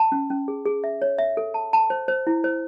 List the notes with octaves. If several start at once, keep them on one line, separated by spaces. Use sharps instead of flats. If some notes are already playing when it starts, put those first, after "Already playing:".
Already playing: A5
C#4
C#4
G#4
G#4
E5
C#5
E5
A4
A5
A5
C5
C5
E4
C5